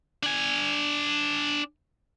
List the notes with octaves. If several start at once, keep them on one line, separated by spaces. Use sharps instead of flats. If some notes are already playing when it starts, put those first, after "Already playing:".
D4 G#5